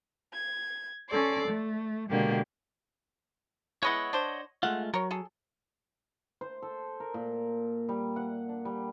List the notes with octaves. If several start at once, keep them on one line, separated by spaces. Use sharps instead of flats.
G#6
C#4 A4 D5 C6
A3
B2 D3 G#3 A#3 G4
G#3 B3 E4 C#5 D#5 F#5
D4 C5
G#3 A3 F4 F#5
F#3 A#4 C#5
G#4 A4
C5
A4
A#4
A#2
G3
F#5
D4
G3